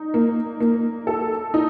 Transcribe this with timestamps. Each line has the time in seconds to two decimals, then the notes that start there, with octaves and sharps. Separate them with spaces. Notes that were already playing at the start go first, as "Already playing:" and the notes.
Already playing: D#4
0.14 A#3
0.60 A#3
1.07 A4
1.54 D#4